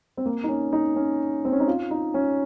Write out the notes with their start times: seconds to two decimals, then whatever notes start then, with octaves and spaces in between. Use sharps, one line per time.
0.17 C4
0.25 A#3
0.44 D#4
0.49 C#4
0.73 D#4
0.96 C#4
1.45 C4
1.52 C#4
1.60 D#4
1.67 F4
1.91 D#4
2.14 C#4